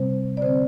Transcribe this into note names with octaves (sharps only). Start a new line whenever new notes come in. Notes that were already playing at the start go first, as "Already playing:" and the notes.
Already playing: C3 G3 C4 C5
D5
D3 C4 C5